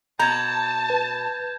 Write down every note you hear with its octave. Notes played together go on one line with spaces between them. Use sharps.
B2 A5 A#5 G6 G#6
B4